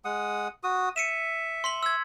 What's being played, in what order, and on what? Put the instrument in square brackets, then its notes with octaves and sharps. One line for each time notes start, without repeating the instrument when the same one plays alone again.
[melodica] G#3 F#5 D#6
F#4 D#6
[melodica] E5 [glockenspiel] C#7 D#7 E7
[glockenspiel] C6 B6 F#7
E6 G#6